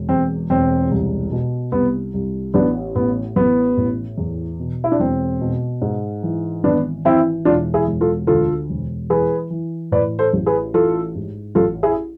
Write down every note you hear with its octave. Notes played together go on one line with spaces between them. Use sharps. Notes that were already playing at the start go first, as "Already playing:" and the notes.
Already playing: E1
E2 C4
E1 C4
C2
B2
C2 B3
C2
A1 B3 D4
A2 B3
A1 B3
A2
E2
B2
E4
D4
E1 C4
B2
G#2
E3
G#1 B3 D4
E3 C4 E4
E1 D4 F4
E4 G#4
E1
F4 A4
D2 F4 A4
E1
E3 G#4 B4
E3
A2 B4 D5
A4 C5
A1
G#4 B4
E3 F4 A4
G#2
A1 F4 A4
E4 G#4